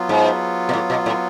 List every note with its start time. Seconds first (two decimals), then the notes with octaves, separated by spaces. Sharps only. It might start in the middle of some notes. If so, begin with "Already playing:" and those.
Already playing: F#3 B3 F4
0.09 G#2
0.69 B2
0.73 A2
0.90 B2
1.06 A2